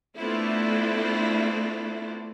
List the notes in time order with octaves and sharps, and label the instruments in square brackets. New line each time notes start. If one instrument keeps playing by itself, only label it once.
[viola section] A3 B3 C4 D4 E4 F4